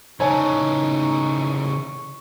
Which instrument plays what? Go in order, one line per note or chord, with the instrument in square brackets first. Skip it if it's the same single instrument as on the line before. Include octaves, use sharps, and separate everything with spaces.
[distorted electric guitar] C#3 E3 [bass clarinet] D#4 [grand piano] C#5 G#5 A5 [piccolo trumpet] C#6